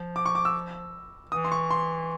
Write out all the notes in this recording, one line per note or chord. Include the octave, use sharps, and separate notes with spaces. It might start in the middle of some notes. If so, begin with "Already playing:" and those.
Already playing: F3
D6
C#6
D6
E6
E3 D#6
C6
C#6
C6